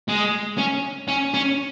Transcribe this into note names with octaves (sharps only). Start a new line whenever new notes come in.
G#3
C#4
C#4
C#4